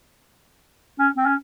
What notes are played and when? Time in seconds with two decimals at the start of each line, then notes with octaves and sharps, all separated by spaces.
0.99 C#4
1.17 C4
1.26 C#4